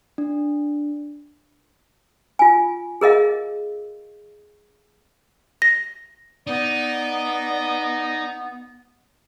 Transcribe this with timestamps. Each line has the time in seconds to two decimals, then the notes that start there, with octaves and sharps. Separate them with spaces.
0.18 D4
2.39 F4 G#5
3.01 G#4 A#4 D#5 F5
5.62 A#6
6.47 B3 D#4 D5